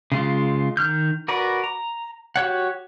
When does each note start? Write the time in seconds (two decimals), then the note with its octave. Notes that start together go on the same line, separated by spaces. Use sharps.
0.12 C#3 G#3 F4
0.77 D#3 F6 G6
1.28 F#4 A#4 B4 D5
1.64 A#5
2.36 F#4 G4 C#5 F#5